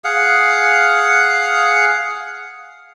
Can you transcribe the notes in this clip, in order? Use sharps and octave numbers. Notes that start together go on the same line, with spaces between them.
G#4 F5 F#5